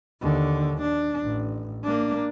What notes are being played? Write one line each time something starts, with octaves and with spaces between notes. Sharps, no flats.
D#2 D3
D4
A1
A#3 D4